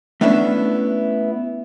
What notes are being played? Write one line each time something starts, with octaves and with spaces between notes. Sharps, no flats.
A3 B3 C#4 D4 E4